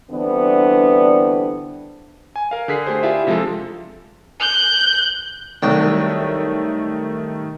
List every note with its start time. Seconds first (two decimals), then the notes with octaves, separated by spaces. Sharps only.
0.11 D3 E3 G3 B3 C4 D4
2.36 G#5
2.51 A#4 F5
2.68 D3 G#4 B6 C7
2.86 A3 G4 G#4 C5
3.03 D4 E4 F4 G4 G#4 E5
3.27 C3 F3 G#3 F4 A4
4.40 F#6 G6
5.62 C2 D#3 F#3 A3 G5